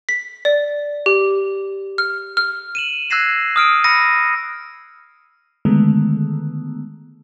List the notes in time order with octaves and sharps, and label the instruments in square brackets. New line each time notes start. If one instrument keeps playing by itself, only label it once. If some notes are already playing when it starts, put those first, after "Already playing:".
[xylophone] B6
D5
G4
F6
F6
[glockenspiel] D#7 E7 F#7
E6 F#6 G#6 A#6 C7 E7
D#6 F6 D7 D#7
B5 E6 A#6 C#7 D#7
[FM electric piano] D3 D#3 G#3 A3 B3